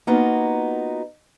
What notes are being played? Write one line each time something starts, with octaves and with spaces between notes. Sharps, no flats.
A#3 B3 D#4 F4 F#4